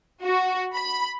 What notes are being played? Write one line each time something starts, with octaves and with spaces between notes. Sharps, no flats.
F#4
B5